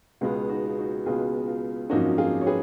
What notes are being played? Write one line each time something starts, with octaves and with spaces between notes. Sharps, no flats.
C#2 B2 G#3 B3 F4
D#4 F#4
F4
D#4 F#4
C#2 B2 G#3 B3 F4 G#4
F4
G#1 F#2 F3 A#3 C#4 D#4 F#4
F4 G#4
C#5
G#4 B4